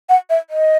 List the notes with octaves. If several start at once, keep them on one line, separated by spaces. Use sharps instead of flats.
F#5
E5
D#5